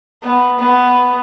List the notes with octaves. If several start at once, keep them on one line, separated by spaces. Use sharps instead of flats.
B3
B3